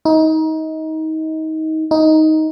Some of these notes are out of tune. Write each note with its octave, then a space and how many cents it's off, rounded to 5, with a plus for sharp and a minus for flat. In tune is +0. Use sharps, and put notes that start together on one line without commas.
D#4 +25
D#4 +10